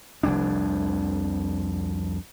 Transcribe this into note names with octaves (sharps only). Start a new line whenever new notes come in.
F1 C2 F2 D4